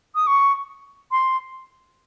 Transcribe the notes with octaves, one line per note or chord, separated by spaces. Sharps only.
D#6
C#6
C6